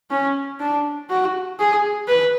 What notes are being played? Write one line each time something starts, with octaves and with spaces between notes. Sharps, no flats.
C#4
D4
F#4
G#4
B4